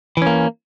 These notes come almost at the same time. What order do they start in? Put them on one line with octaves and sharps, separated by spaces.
E3 C#4 A#3